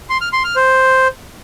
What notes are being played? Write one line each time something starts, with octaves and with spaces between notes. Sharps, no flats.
C6
F6
C6
F6
C5